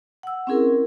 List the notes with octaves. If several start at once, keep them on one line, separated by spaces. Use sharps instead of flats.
F#5 E6
C4 C#4 E4 G#4 A#4